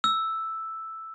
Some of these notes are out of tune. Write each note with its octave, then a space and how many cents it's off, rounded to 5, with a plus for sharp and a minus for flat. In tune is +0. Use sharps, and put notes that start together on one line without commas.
E6 +0